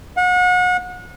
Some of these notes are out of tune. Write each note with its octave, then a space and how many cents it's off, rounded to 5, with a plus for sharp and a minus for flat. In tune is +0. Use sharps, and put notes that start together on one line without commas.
F#5 -35